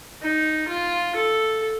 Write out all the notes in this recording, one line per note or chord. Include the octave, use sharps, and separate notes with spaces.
D#4
F4
A4